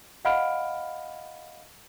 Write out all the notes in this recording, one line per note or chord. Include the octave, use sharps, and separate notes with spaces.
D#5 F5 F#5 B5 F6 D7